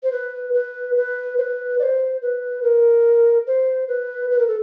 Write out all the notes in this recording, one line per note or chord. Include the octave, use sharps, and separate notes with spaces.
C5
B4
B4
B4
C5
B4
D5
C5
B4
A#4
C5
B4
B4
A#4
A4